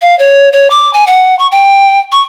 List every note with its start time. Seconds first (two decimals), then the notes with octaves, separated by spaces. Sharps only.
0.02 F5
0.19 C#5
0.53 C#5
0.70 D6
0.93 G#5
1.07 F#5
1.39 C#6
1.52 G5
2.12 C#6